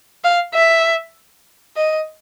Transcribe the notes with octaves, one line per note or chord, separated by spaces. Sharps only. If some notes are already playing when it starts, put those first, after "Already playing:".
F5
E5
D#5